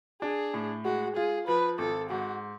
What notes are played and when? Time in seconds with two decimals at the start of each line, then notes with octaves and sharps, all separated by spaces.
0.22 D4 G#4
0.54 A2
0.85 G#3 F#4
1.16 F4 G#4
1.47 F3 B4
1.78 G#1 A4
2.10 G#2 F#4